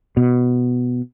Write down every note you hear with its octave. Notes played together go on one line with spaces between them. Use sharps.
B2